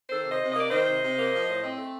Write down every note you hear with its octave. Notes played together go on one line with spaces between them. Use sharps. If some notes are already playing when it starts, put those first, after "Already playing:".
D#3 A4 C5
C3
C5 D#5
C3
D#5
A#3 D5
D#3 C5 D#5
C3
C3
A#3
F3
A2
C4
A3